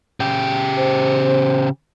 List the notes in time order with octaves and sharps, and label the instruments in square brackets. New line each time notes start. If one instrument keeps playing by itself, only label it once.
[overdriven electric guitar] C#3 G4
[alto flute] C5